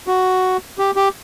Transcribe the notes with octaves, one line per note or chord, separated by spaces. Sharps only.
F#4
G4
G4